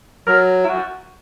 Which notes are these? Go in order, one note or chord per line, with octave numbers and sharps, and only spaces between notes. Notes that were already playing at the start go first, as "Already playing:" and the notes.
F#3 A#4
E4
F#4